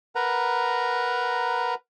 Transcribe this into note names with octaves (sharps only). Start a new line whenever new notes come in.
A#4 B4 F#5 A#5